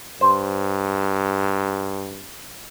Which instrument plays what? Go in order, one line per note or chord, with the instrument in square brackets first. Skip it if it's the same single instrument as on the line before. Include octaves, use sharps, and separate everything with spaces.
[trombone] G2 [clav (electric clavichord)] C5